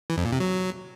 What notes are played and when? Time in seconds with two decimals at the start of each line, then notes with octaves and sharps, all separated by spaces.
0.10 E3
0.17 F2
0.25 A#2
0.32 C3
0.40 F#3